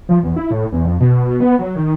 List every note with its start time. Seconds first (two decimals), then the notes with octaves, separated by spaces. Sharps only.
0.09 F3
0.23 E2
0.36 E4
0.51 A2
0.72 E2
0.85 F2
1.00 B2
1.40 B3
1.59 F#3
1.76 D#3